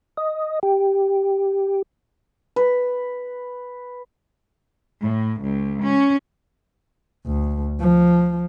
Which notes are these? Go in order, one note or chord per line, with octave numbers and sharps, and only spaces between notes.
D#5
G4
B4
A2
C#2
C#4
D2
F3